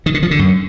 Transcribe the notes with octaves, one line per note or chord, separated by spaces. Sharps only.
D#3
D3
F3
D3
F#2